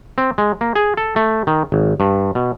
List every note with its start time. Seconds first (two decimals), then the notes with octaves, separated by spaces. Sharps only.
0.18 C4
0.38 G#3
0.61 A#3
0.75 G#4
0.97 A4
1.16 A3
1.47 D#3
1.72 G#1
2.00 G2
2.35 B2